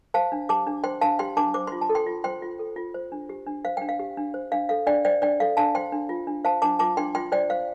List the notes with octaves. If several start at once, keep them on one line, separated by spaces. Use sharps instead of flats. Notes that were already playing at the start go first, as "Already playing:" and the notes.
C5 F5 A5
D4
G4 A5 D6
D4
C5 G5 C6
D4 F5 A5
G4 G5 C6
D4 A5 D6
C5 D6
F4 C6
A5
A4
G5 C6
F4
C5 G5 C6
F4
A4
F4
C5
D4
G4
D4
C5 F5
D4 G5
F5
G4
D4
C5
D4 F5
A4 F5
D4 D5 G5
C5 D5 G5
D4 D5 G5
A4 F5
D4 F5 A5
C5 G5 C6
D4
F4
D4
C5 F5 A5
D4 A5 D6
F4 A5 D6
D4 G5 C6
F4 G5 C6
C5 D5 G5
C5 F5